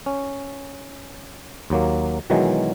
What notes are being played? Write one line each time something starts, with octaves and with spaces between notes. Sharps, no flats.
C#4
D#2 F#3 A#3
B2 D#3 E3 F#3 G#3